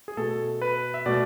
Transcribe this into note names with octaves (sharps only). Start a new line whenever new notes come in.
G#4
B2 A3 A4
B4
E5
B2 A3 D5